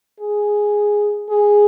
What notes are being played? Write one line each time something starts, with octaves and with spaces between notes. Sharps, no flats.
G#4
G#4